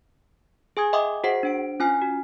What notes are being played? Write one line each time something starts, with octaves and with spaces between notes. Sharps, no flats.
G#4 G#5 D#6 G#6
D#5 E5 G5 C6 D6 D#6
F#4 G#4 C5 F#5 C7
D4 C5 D7
C#4 F4 G#5 F6 C7
F#4